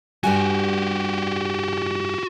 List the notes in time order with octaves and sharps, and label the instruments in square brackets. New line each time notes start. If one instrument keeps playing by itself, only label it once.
[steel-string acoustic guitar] G2 G3 G#5 [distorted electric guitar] F#4 G4